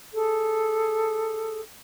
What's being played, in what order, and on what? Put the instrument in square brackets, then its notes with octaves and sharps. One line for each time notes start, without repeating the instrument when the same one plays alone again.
[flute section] G#4 A4